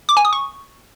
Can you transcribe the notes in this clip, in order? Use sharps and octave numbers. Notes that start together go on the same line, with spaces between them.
D6
G#5
D#6
C#6